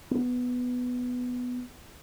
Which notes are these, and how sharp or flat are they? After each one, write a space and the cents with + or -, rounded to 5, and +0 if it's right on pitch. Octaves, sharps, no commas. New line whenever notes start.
B3 +5